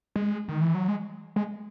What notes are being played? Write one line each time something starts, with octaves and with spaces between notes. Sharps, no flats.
G#3
D#3
E3
F#3
G#3
G#3